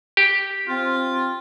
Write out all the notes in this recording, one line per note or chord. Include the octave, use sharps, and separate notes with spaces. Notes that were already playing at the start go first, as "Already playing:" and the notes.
G4
C4 F4